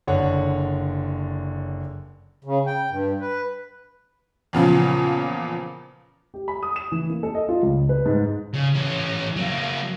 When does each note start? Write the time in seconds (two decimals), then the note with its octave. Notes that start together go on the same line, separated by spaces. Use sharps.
0.07 F#1 D3 C#5 F#5
2.44 C#3
2.67 G5
2.90 G2
3.20 B4
4.53 E2 A#2 C#3 F3
6.34 G4
6.48 B5
6.63 D#6
6.76 E7
6.92 E3
7.10 A#3
7.23 A4
7.35 D#5
7.49 F4
7.62 C#2
7.89 B4
8.06 G#2
8.54 C#3
8.74 E3 C#4
9.36 F#3 A#3